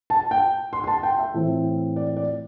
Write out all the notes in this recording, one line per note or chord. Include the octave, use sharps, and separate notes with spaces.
A5
G5
C6
C6
A5
G5
E5
A2 E3 C4 E4
D5
D5